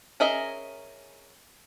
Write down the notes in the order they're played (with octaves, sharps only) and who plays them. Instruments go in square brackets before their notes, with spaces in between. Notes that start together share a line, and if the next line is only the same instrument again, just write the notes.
[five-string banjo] C#4 G#4 A#4 D#5 E5